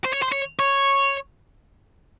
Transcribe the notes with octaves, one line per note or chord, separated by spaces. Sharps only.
C5
C#5
C5
C#5
C#5